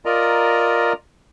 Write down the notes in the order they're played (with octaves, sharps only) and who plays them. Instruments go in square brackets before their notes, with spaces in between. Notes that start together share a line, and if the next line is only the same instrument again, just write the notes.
[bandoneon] F4 A#4 D5 D#5 A#5